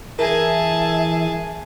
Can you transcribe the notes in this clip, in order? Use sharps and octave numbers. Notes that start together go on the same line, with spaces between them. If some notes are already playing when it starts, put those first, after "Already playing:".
E3 G#4 A#4 E5 A5